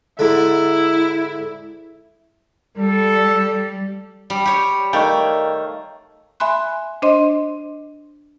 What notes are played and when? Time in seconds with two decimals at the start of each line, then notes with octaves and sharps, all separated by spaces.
0.19 G#2 D3 E4
2.77 G3 A4
4.30 G3
4.45 G4 C#5
4.93 D#3 A3 C#5 F5 G5
6.40 E5 G#5 B5 C6 F#6
7.02 D4 C5 D#5 C6